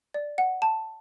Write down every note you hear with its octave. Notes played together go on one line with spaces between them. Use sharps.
D5
F#5
A5